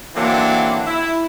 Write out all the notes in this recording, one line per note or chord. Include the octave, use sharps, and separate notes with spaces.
D3 E3 F#3 A#3 C4 D4
E4